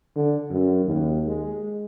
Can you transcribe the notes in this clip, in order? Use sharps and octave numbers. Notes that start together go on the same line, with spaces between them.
D3
F#2
D#2
G#3